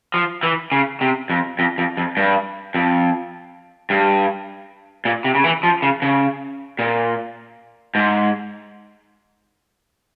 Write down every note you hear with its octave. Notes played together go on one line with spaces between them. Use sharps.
F3
E3
C#3
C3
F2
F2
F2
F2
G2
F2
G2
A#2
C3
C#3
E3
F3
C#3
C#3
A#2
G#2